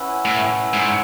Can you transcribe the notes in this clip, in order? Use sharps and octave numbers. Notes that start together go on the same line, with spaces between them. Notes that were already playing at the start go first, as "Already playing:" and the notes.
Already playing: C#4 E4 B4 F#5
A2
G#2